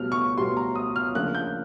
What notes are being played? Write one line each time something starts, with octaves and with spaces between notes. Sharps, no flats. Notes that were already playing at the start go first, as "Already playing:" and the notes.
Already playing: B2 G3 B3 F6
C#6
B2 G3 B3 C6
A#5
D#6
F6
C#3 F3 A#3 D4 F#6
G6